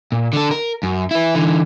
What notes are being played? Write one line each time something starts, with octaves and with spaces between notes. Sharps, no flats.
A#2
D3 A4
A#4
F#2
E4 B4
D3 E3